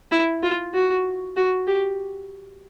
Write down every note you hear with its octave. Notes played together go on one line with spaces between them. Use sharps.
E4
F4
F#4
F#4
G4